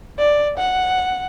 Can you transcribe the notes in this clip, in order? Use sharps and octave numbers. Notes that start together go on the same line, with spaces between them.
D5
F#5